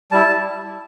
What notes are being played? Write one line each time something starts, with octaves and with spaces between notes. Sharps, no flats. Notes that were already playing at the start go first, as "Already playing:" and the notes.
G3 E4 A5